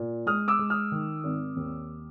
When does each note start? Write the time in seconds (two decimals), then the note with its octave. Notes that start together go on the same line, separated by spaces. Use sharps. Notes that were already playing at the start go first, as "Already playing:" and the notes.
Already playing: A#2
0.26 G#3 D#6 F6
0.48 D6 E6
0.59 G#3
0.70 D#6 F6
0.92 D#3
1.24 G#1
1.56 D#2